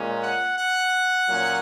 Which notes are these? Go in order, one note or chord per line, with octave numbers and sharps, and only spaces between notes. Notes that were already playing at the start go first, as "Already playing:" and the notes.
Already playing: A#2 G#3 C#4
F#5
F#5
A#2 F#3 C#4